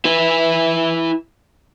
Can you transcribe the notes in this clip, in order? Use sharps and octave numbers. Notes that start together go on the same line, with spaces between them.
E4 B4